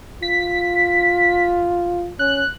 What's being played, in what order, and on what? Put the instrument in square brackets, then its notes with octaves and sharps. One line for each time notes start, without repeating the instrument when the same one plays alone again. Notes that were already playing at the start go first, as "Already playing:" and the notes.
[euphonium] F4 [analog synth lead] B6
[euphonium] C#4 [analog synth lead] F#6